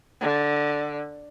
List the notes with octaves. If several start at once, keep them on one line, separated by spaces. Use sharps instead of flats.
D3